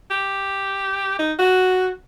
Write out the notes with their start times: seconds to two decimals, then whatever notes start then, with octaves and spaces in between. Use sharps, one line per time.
0.11 G4
1.19 D#4
1.39 F#4